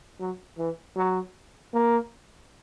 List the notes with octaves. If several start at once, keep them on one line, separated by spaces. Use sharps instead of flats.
F#3
E3
F#3
A#3